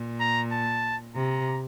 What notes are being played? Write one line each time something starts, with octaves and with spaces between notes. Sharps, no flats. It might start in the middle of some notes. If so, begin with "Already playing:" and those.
Already playing: A#2
A#5
A5
C3 A#5